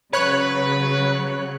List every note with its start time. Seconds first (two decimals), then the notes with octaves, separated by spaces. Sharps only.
0.13 C#3 F#3 B4 C#5 F#6